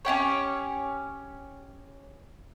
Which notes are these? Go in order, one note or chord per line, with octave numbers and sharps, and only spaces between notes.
C#4 E4 G4 C#5